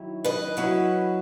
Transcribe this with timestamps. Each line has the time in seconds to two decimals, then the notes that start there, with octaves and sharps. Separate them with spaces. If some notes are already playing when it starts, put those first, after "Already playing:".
Already playing: D#3 F#3 C#4 E4
0.25 B4 D#5
0.57 F#3 C#4 E4